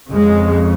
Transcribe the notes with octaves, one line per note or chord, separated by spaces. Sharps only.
F2 C#3 G#3